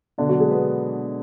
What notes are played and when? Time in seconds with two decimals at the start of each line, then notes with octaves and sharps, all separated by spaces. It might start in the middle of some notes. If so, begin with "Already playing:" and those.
0.18 B2 D3 D4
0.29 F#3 F#4
0.40 G#3 G#4
0.50 B3 B4